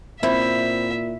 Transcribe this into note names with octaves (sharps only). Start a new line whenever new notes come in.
A#2 C4 E4 E5